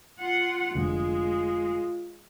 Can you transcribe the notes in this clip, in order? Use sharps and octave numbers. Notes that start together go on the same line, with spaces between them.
F4 F#5
F1 D3 G#3 F4